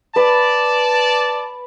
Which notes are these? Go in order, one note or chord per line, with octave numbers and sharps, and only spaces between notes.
B4 D5 A5